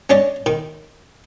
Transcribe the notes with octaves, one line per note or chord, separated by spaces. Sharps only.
C#4 D4 C#5 D#5 A5
D#3